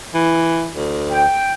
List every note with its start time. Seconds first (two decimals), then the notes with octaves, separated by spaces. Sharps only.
0.15 E3
0.75 D2
1.11 G5